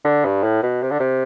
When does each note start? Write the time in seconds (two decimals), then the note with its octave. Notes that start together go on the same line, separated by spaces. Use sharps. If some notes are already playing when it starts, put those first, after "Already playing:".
0.05 D3
0.25 G2
0.43 A2
0.63 B2
0.82 C3
0.90 D3
0.99 C3